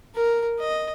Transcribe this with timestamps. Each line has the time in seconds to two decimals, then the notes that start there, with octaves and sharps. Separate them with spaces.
0.15 A#4
0.59 D#5